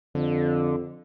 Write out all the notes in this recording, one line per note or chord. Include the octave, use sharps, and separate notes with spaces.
F2 D3